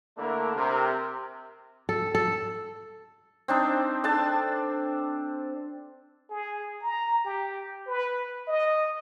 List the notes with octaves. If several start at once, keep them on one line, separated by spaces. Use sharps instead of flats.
D3 A3 A#3 D4 E4 A#4
C3 A#4
A4
A4
C4 D4 D#4
D4 A4 C5 A5
G#4
A#5
G4
B4
D#5